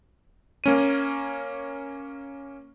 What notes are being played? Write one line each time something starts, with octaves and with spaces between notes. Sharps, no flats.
A#3 C#4 D#7